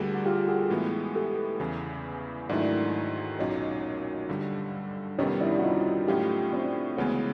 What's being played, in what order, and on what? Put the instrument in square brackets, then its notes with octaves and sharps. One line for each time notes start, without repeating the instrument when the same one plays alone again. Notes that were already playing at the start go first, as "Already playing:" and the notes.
Already playing: [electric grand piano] D2 D3 G3 A#3 [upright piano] F#4 G#4
[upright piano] F#4
F4 G4
F#4 G#4
[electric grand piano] A2 E3 G#3 B3
[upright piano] G4 A4
[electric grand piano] E2 C#3 E3
[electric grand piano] G#2 D#3 F#3 A3 [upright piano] D4 E4
[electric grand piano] B1 A#2 F#3 [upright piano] C#4 D#4
[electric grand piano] G2 D3 G3
[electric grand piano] F2 C3 D#3 G3 B3 [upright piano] C#4 D#4
[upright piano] D4 E4
F#4
D#4 F4
[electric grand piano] A2 F#3 A3 C#4 [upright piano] F4 G4
[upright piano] C4 D4
[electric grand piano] D2 C#3 E3 G#3 [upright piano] B3 C#4